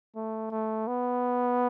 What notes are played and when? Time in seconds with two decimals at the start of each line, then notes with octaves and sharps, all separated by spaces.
0.16 A3
0.51 A3
0.88 B3